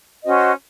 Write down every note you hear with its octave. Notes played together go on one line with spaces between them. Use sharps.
C#4 F#4 C5 D#5